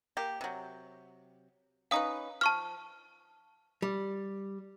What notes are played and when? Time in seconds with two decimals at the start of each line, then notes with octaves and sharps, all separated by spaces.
0.17 A#3 G4
0.41 C3 F#3
1.91 C#4 D#4 B4 F5 D#6
2.41 F3 A5 C#6 F6
3.82 G3